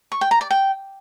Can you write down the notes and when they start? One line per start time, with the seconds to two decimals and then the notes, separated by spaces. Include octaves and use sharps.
0.12 C#6
0.21 G5
0.31 A#5
0.41 D5
0.51 G5